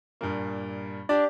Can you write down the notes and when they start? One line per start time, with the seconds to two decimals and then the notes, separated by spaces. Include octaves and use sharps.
0.21 G2 A#2 A#3
1.09 D4 G4 D5